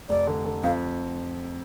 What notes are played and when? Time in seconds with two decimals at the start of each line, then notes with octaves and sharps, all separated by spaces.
0.09 F1 D5
0.27 D3
0.45 D3
0.63 F2 F5